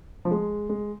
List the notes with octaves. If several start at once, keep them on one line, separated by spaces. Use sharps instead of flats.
F3
G#3
G#3